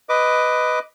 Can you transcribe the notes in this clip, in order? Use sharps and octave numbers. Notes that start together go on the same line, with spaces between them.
B4 D#5 D6